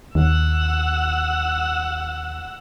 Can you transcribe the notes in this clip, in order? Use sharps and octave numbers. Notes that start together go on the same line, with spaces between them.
D#2 F#5 E6